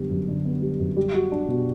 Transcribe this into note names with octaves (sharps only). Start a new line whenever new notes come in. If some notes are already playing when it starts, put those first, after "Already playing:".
Already playing: F#2 D3 G3 B3
F#2
D3
B3
G3
F#2
G3
F#4
D4
B2